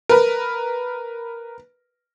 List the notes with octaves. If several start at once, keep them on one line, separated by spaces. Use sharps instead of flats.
A#4 B4